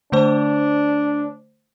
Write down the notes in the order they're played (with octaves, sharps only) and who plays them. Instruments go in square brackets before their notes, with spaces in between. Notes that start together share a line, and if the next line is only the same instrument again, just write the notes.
[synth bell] D3 A3 C5 [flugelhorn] D4